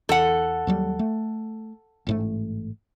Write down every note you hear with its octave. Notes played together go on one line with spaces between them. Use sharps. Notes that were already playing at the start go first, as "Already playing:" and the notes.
E2 A4 F#5
D#2 F#3 G3
A3
A1 G#2 A3